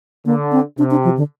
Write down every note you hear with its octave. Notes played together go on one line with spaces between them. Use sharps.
D3 A#3
C4
C3 D4
D4
F3
D3